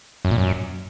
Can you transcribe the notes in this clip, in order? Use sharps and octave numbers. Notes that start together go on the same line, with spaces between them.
F#2
A#2
F#2